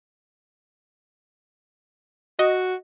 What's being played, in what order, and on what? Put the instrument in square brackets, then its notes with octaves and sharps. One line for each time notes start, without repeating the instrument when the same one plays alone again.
[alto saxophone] F#4 [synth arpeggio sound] D#5